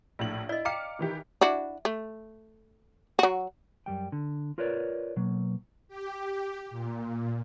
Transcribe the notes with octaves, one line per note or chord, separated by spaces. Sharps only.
A#1 A2 F#7
E4 D5 D#5
F5 G5 A#5 D6 F6 C#7
D#3 E3 G4
D4 E4 F#4
A3
F#3 F#4
F#2 G3 G5
D3
F4 A#4 B4 C#5 D5
B2 F#3 A#3
G4
A#2